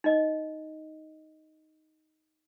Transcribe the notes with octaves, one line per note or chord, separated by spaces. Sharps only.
D#4 D#5